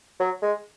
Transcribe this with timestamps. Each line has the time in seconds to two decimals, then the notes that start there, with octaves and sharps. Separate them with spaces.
0.20 F#3
0.42 G#3